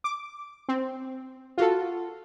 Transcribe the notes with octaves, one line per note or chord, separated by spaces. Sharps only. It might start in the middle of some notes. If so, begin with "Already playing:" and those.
D6
C4
F4 F#4 A4